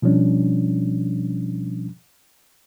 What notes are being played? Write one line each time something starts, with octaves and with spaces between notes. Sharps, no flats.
B2 F3 G3 C#4 D4